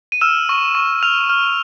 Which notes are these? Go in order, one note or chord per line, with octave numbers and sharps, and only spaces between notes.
D#7
E6 F6 E7
C#6
C#6
F6 F7
F6